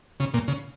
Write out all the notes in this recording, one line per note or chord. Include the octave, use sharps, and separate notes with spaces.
C#3
A#2
C#3